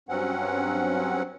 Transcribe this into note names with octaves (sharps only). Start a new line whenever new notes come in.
G2 F#3 C4 C#4 F#5